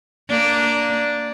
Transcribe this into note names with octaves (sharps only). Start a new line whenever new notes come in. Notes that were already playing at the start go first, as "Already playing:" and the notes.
A#3 D4